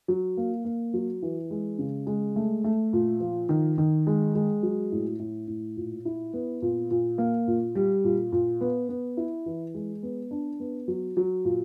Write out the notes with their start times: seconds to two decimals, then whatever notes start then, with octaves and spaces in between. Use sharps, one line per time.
0.08 F#3
0.37 A#3
0.65 A#3
0.94 F#3
1.22 E3
1.51 G#3
1.79 C#3
2.07 G#3
2.36 A3
2.64 A3
2.93 A#2
3.20 F3
3.49 D#3
3.78 D#3
4.07 G#3
4.35 G#3
4.63 F#3
4.92 A2
5.19 A2
5.48 A2
5.77 A#2
6.05 E4
6.33 B3
6.62 A#2
6.91 A#2
7.18 A#3
7.48 A#2
7.75 G3
8.04 A#2
8.32 A#2
8.61 B3
8.89 B3
9.17 E4
9.46 E3
9.74 G#3
10.03 B3
10.31 D4
10.60 B3
10.88 F#3
11.17 F#3
11.45 A#2